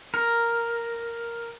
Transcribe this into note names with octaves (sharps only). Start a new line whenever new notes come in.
A#4